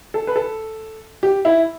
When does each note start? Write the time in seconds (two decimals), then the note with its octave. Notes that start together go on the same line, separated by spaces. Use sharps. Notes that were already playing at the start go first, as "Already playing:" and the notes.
0.14 A4
0.27 B4
0.36 A4
1.23 G4
1.45 E4